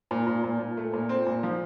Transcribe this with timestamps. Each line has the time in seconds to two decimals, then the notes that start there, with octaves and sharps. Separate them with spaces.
0.11 A#2
0.27 A#2
0.44 A#2
0.59 A#2
0.77 A3
0.93 A#2
1.09 C4
1.27 A#2
1.43 F3